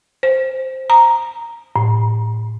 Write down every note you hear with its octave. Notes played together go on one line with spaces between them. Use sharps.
C5
A#5
A2